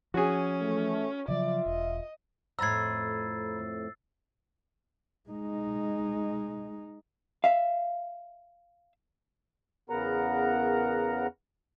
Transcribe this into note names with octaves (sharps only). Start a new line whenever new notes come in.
F3 C#4 F#4 G#4
E3 A3
C#3 F3 F#3 F4 D5 E5
E1 D#5
F2 A2 A#5 B5 E6 G#6 A6 C7
G#3 D#4
E5 F5
E2 C#3 B3 A#4 F#5 A#5